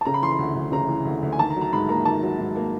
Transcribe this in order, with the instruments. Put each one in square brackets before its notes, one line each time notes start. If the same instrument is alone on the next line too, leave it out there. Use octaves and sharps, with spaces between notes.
[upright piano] A5
C#3 A#5
B5
E3 C6
B5
D2
D2
C#3 A#5
E3
D2
D2
G#5
D#3 A5
A#5
F#3
A#5
G#2 B5
A#3 A#5
D#3 A5
F#3
G#2
A#3